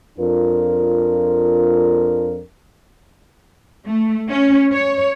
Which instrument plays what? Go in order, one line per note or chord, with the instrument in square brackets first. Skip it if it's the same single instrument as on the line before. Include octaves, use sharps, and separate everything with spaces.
[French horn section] F2 D4 F4 A#4
[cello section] A3
C#4
C#5